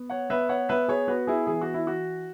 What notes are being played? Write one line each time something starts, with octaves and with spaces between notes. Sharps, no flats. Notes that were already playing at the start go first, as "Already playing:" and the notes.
Already playing: B3
C#5 F#5
B3 B4 E5
C#5 F#5
B3 B4 E5
G#4 C#5
B3 F#4 B4
E4 G#4
E3 G#4
F#4
E4
E3 F#4